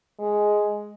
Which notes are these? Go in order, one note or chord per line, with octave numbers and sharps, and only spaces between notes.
G#3